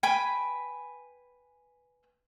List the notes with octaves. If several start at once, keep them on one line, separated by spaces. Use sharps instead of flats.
B4 G5 G#5 B5